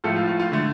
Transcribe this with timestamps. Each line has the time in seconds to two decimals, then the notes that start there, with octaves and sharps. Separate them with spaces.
0.04 A2 F3 A3 F4 A4
0.16 F4
0.27 F4
0.40 F4
0.52 D3 A3